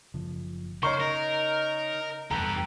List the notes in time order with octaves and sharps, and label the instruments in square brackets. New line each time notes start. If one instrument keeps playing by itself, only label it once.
[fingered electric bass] F#1 C#3 F3
[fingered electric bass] C#3 [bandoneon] D#4 A#4 [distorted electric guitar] C5 [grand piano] C#5 C#6
[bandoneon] D#4 [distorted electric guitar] A#4
[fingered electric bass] F1 E2 G2 [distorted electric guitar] G4 B4 [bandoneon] A4 [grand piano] A#5